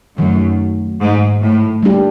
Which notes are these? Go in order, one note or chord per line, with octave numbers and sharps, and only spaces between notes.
F#2 D#3 F#3 A3
G#2
A2
G3 A#3 D4 G4